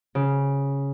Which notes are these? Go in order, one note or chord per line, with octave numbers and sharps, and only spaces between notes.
C#3